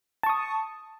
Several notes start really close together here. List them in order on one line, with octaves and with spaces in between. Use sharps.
A5 C#6 D#6